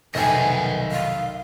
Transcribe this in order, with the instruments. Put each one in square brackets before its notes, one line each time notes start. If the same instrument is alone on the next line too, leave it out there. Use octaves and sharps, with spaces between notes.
[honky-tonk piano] F1 A6 [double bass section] B1 D#3 [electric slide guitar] D#5 E5 G5 [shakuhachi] G#5
[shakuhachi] F5